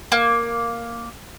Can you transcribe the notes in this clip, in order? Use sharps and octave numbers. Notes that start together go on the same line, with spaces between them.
A#3